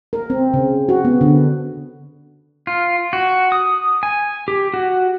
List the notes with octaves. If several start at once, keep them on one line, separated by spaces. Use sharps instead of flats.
A#4
C4
C#3
F#4
B3
D3
F4
F#4
D#6
G#5
G4
F#4